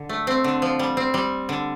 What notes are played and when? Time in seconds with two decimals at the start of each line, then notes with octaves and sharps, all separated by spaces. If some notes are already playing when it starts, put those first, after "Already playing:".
Already playing: D3
0.09 A3
0.27 C4
0.44 D3
0.62 F3
0.79 G3
0.97 C4
1.14 G3
1.49 D3